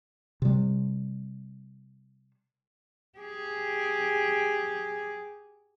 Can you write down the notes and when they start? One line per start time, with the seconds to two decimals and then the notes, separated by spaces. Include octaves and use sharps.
0.42 C3 G3
3.18 G4 G#4